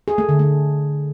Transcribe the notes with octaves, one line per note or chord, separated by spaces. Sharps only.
G#4
A3
D3
A3